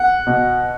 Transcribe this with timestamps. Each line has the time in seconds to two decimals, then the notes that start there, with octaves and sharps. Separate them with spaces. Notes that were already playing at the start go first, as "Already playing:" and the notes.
Already playing: F#5
0.27 B2